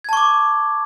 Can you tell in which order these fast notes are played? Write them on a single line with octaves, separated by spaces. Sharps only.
G#6 A5 C#6 D6